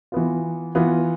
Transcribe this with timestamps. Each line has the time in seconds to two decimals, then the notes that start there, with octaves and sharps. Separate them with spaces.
0.12 E3 B3 F4
0.75 E3 B3 F4